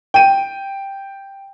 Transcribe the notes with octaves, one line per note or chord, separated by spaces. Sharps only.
G5 D#7